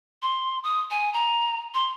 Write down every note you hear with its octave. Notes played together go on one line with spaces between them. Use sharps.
C6
D#6
G#5
A#5
C6